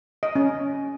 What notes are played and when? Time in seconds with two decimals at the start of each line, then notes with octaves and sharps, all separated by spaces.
0.23 D#5
0.35 C#4